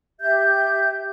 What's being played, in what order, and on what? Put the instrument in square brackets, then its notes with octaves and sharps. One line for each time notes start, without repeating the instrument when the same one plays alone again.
[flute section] G4 E5 G6